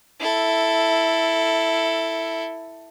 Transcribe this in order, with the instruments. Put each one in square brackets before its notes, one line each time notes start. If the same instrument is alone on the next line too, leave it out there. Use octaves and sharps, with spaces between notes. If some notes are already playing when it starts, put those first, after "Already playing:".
[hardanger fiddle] E4 A4